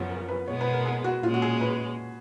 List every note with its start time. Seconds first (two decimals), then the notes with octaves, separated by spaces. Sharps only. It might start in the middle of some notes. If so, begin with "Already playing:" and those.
Already playing: F#2 C#3 F3 B3 F4
0.10 A#4
0.28 B4
0.47 B2 G#3 B3 C#5
0.61 B4
0.73 A#4
0.85 G#4
1.04 F#4
1.23 A#2 F4
1.26 G#3 C#4
1.34 F#4
1.42 G#4
1.61 B4